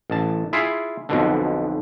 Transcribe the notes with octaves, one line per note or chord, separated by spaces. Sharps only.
A1 A5
E4 F4 G#4
B1 F2 B2 D3